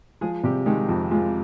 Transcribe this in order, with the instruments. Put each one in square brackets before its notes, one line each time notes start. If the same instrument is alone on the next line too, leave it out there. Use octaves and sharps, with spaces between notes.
[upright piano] F3 [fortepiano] G#3 G#4
[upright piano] C3 [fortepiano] G3 G4
[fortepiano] D#3 D#4 [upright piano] G#3
[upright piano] F2
[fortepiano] F3 F4 [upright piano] G#3